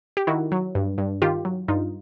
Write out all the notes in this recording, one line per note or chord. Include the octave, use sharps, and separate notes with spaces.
G4
D#3 E4 F#4
F#3
G2
G2
D#3 F4 G4
F#3
G2 D#4 F4